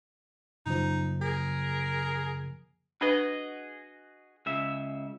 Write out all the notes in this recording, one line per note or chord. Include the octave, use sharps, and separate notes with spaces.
F#2 C#3 F3 F#3 A#3 D#4
G#4 A#4
D4 F#4 G#4 B4 D#5
C#2 C#3 E5